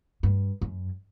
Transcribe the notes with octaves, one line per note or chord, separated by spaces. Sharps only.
G2
F#2